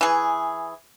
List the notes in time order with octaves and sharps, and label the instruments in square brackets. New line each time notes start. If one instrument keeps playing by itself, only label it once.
[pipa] E3 G#4